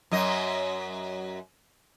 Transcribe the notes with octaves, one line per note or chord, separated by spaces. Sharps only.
F#2 F#3 D#5